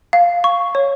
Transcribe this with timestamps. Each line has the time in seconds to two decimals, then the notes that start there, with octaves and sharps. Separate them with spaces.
0.13 F5
0.44 C#6
0.75 C#5